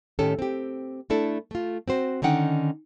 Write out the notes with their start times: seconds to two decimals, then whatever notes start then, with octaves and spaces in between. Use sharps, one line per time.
0.19 A2 D#3 C#4 G4 A4
0.39 C4 G4
1.10 A3 D4 E4 A4
1.51 A3 F4
1.88 C4 F#4 C5
2.22 D3 D#3 C#4 D#4 F#5 G5